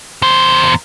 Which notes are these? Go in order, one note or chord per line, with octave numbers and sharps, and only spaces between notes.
E2 C5